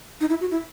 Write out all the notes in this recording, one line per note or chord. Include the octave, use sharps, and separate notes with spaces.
D#4
E4
F#4
E4